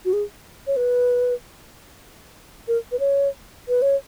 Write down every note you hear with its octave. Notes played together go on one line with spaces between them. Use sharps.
F#4
G#4
C#5
B4
A#4
B4
C#5
B4
C#5